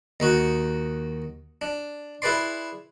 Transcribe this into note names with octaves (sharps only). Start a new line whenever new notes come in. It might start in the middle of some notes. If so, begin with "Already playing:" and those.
D#2 D#4 F#4
D4
E4 G#4 B4 D5 C6